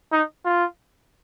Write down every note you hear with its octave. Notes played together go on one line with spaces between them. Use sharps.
D#4
F4